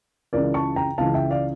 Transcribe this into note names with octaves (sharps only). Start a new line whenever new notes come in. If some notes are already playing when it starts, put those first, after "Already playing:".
C#2 C#3 E3 A#4 D5
A5 C#6
G5 A#5
C#2 C#3 E3 F5 A5
E5 G5
D5 F5